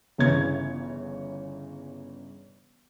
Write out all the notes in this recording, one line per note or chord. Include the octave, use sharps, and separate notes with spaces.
G1 C#3 E3 C#5 G#6